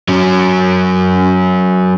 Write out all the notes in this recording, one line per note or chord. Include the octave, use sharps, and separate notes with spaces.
F#3 C#4